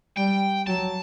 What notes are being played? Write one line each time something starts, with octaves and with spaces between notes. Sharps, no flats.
G3 G5
F#3 A5